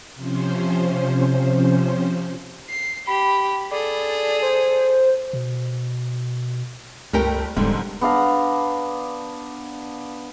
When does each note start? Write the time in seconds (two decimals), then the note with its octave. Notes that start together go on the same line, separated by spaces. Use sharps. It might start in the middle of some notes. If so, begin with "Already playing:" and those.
0.15 C3 F3 C#4 C5
2.70 C7
3.07 G4 B5
3.72 G#4 A4 D5
4.42 C5
5.33 B2
7.13 G1 C#2 A3 G4 A#4 G5
7.57 D#1 F2 G#2 D3 G3
8.01 B3 D4 F5 A#5